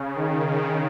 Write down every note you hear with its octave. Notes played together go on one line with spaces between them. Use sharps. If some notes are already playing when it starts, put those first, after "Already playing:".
Already playing: C#3
D#3